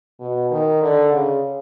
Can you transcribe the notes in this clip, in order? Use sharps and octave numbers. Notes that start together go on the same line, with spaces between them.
B2
D#3
D3
C#3